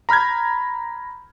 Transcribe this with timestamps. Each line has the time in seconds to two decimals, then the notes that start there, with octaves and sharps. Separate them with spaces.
0.09 A#5 B5 F6 G6 G#6